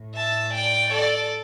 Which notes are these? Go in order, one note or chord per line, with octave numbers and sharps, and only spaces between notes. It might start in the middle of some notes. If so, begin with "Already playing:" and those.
Already playing: A2 A3
E5 A5
D5 G5
A4 D5